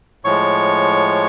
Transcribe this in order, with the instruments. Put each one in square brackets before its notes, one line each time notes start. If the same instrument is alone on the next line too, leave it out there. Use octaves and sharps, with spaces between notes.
[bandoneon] A2 F3 G#3 C#5 C#6